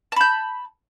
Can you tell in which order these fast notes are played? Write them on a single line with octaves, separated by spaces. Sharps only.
A5 B5 G6